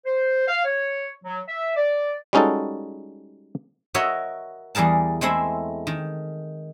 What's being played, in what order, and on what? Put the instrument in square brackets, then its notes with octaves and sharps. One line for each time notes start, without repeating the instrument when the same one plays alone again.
[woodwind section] C5
F5
C#5
F#3
E5
D5
[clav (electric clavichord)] G3 G#3 C#4 D#4 F#4 A4
[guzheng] F#4 A#4 C#5 D#5 E5
E2 G3 G#4 A#4 A5
G#3 A3 C4 E4
D#3